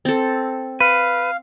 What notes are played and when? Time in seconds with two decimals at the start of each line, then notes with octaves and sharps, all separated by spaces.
0.05 C4 A4
0.80 B4 F5